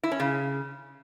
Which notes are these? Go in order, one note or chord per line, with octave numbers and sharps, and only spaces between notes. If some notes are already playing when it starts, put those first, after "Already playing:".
E4
C#4
C#3